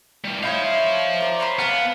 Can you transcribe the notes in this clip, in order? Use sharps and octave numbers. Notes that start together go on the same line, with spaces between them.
A2 G3
D#4 E4 C5 C#5 F5
A#4 D5
C#5 A#5 B5
B3 F5 A5 B5